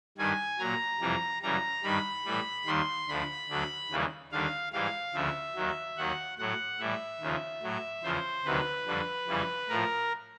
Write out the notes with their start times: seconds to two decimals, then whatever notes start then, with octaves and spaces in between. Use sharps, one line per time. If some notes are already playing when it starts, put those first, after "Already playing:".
0.18 G2 D#3 G3 G#5
0.59 A#2 F#3 A#5
1.01 F2 C3 E3 G3
1.43 F#2 C#3 E3 G3 A#5
1.83 G2 D#3 G3 B5
2.25 A2 E3 G3
2.66 D#2 D#3 G3 C6
3.08 D2 D3 F3 B5
3.49 D2 D3 F#3
3.90 D#2 C#3 E3 G3
4.32 D#2 D3 G3 F5
4.72 G#2 E3 G3 F5
5.14 D2 C#3 F3 E5
5.55 D#2 D#3 F#3
5.97 D#2 D#3 F#3 F#5
6.38 A2 F#3 F#5
6.80 A2 E3 G3 E5
7.20 D#2 C#3 F3
7.62 A2 F#3
8.03 E2 C#3 F3 C5
8.45 D2 C3 D#3 F#3 B4
8.86 F2 D3 G3
9.27 F2 C#3 E3 G3
9.69 A2 F3 A#4